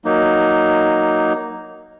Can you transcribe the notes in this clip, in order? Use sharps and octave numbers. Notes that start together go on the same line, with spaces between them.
F#3 A#3 D#4